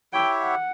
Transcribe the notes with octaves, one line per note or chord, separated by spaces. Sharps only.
E4 G4 C#5 E5 G5
F#5